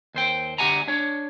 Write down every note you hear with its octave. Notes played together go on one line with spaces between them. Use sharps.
D#2 C5 G5
D2 G4 F#5 G#5 A#5
D4 C#5